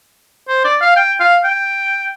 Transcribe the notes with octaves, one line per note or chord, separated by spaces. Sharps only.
C5
D5
F5
G5
F5
G5